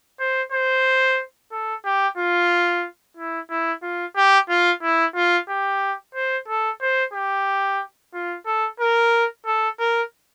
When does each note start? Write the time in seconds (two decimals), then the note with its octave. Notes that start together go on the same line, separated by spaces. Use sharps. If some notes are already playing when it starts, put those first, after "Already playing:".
0.19 C5
0.52 C5
1.52 A4
1.85 G4
2.18 F4
3.17 E4
3.50 E4
3.83 F4
4.16 G4
4.49 F4
4.83 E4
5.16 F4
5.49 G4
6.15 C5
6.48 A4
6.81 C5
7.13 G4
8.14 F4
8.46 A4
8.80 A#4
9.46 A4
9.79 A#4